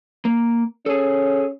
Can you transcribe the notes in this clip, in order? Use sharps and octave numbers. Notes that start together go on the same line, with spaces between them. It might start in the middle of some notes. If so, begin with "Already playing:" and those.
A#3
C#4 G#4 A4